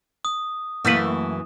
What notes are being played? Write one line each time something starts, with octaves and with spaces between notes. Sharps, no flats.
D#6
F#2 E3 A3 A#3 B4